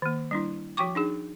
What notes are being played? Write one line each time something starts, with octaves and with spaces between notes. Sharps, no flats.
D#3 A#3
G3 D4 E4
F3 F#4 G5 C#6 D6
D4 D#4 G#4